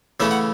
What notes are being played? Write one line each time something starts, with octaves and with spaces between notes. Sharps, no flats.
C#3 E3 A3 C#4 E5
F#5